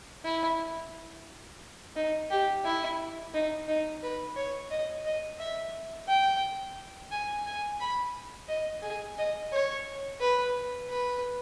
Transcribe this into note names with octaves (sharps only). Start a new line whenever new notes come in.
E4
D#4
G4
E4
D#4
D#4
B4
C#5
D#5
D#5
E5
G5
G#5
G#5
B5
D#5
G#4
D#5
C#5
B4
B4